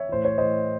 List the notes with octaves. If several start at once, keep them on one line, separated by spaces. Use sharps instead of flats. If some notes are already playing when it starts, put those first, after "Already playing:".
Already playing: C#5 E5
A2 E3 C5
C#5
A2 E3 C5 D#5